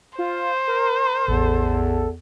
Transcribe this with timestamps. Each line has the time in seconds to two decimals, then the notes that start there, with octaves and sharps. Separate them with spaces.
0.19 F4 C5
0.68 A#4
1.28 A1 E2 A4